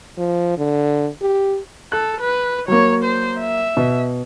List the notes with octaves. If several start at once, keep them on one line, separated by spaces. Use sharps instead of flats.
F3
D3
G4
A4 F#6
B4
F#3 A#3 C#5
C5
E5
B2